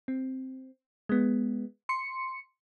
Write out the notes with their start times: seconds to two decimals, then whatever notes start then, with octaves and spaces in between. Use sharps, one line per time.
0.08 C4
1.09 G#3 B3
1.89 C6 C#7